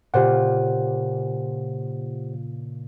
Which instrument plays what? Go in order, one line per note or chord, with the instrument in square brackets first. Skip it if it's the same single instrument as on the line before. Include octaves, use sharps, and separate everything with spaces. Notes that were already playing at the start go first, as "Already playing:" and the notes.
[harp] A#2 C#3 F4 [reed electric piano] G4 C5 F#5